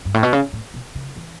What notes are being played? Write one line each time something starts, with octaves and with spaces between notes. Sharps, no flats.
G2
A2
B2
C#3
A2
B2
C#3
E3